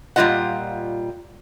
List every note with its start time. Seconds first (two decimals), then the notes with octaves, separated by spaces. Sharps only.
0.16 A#2 G3 C4 F4 D#5 F#5